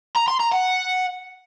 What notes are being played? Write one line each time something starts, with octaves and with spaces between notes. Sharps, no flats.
A#5
C6
A#5
F#5